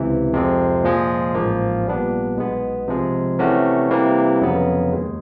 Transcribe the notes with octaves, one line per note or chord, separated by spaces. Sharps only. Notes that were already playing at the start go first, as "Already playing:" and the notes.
Already playing: C#2 C3 E3
F2 C3 F3 G#3 C4
A#2 F3 G#3
A1 G#2 F3 A#3
A#2 G3 B3 D4
B1 B2 G#3 B3
C3 F3 G#3
C3 E3 A3 C#4 F#4
C3 E3 G3 A#3
F2 C#3 F#3 B3
D#2 D#3 G#3